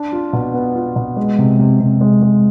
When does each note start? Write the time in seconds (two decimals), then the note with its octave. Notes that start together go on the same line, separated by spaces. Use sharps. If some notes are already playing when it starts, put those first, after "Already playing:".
Already playing: D4
0.12 F4
0.33 B2
0.54 B3
0.75 F4
0.96 B2
1.16 G#3
1.39 C3
1.59 C3
1.80 C3
2.01 G#3
2.22 G#3